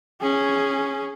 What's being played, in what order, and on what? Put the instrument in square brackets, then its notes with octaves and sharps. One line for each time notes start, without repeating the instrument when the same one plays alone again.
[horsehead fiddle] C#4 G#4